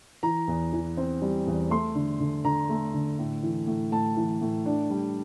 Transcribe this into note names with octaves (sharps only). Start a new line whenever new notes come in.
E3 A#5
E2
E3
C4
G3
E2
A3 C6
D3
D3
D3 A#5
A3
D3
A2
E3
A2
A2 A5
E3
A2
D4
G3